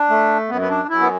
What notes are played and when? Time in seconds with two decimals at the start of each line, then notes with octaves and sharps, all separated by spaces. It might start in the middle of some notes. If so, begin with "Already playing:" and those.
Already playing: D4
0.09 A3
0.49 F#2 B3
0.61 B3
0.69 D4
0.89 F#2 E4
1.01 B3